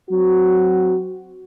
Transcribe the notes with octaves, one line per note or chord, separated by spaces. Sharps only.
F#3 C4 F#4